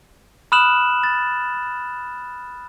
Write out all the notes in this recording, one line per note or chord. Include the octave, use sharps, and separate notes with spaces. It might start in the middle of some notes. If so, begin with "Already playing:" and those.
B5 D#6 F6 F#6 E7 F#7
A6